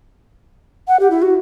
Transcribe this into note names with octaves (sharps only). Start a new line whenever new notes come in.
F#5
G4
E4
F#4